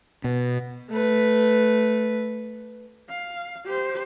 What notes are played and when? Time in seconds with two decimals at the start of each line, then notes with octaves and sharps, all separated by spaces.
0.24 B2
0.90 A3 B4
3.10 F5
3.66 G4 C5